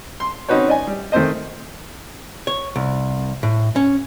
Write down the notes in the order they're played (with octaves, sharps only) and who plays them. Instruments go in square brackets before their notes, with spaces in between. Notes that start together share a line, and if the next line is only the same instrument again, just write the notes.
[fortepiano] C6
C4 C#4 D#4 F#4 B4 C#5
D5 D#5 G#5
G3
D#3 A3 C4 C5 D#5
[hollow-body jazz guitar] C#5
C2
A2
C#4